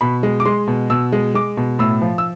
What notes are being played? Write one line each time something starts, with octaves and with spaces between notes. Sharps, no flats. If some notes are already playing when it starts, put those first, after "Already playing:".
B2 B5
G#3
D6
G#3 C6
B2
B2 E6
G#3
G#3 D6
B2
A2 E6
F3
E6